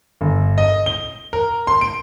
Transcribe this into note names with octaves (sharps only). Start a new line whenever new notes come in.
G1
D#5
G7
A#4
C6
D7